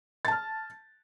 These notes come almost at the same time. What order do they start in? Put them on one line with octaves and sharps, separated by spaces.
A6 A5 F6